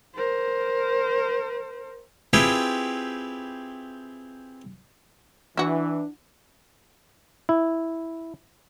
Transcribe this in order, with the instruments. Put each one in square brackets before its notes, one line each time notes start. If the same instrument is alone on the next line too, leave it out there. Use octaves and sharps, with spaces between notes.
[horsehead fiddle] A#4 C5
[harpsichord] C4 E4 F4 G4 G#4 B4
[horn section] E3 [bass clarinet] D4 [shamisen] E4 F#4
[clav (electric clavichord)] E4